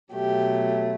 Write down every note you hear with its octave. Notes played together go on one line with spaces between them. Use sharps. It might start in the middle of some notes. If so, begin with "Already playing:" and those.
B2 F#3 A3 G4